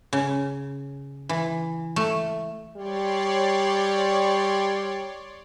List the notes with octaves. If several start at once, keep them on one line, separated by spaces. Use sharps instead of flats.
C#3
E3
A3
G3 C#5 D5 C6